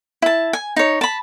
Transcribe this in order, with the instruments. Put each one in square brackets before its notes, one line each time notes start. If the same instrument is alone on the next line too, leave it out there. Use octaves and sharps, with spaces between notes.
[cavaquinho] E4 A5
G#5
D#4 C#5
A5 B5